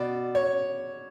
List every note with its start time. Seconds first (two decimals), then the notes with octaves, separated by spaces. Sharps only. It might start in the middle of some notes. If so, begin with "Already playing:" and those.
Already playing: B2 D5
0.35 C#5